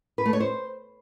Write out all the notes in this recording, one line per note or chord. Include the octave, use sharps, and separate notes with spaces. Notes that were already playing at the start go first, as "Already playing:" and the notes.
B4
A3
C#5
C5